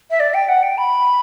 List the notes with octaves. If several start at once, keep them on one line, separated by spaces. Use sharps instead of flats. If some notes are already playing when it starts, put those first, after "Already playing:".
E5
D5
G5
F#5
G5
B5